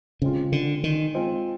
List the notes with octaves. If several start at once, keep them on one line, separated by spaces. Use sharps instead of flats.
C#3 G#3 C4 F4
D3
D#3
G#3 C4 F4